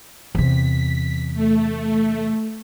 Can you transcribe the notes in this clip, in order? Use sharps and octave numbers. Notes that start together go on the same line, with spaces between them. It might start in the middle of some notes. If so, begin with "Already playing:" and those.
E2 C3 B6
A3